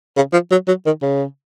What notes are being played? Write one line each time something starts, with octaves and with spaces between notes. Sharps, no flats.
C#3
F3
F#3
F#3
D#3
C#3